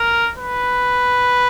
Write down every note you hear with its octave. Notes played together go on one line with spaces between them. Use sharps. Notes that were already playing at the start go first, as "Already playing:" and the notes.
Already playing: A#4
B4